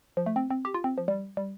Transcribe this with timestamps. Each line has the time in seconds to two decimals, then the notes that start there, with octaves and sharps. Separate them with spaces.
0.17 F3
0.26 A3
0.36 C4
0.50 C4
0.65 G4
0.74 F4
0.84 C4
0.98 F3
1.08 G3
1.37 G3